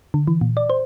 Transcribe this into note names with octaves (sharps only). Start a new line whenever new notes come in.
D3
E3
A#2
D5
C5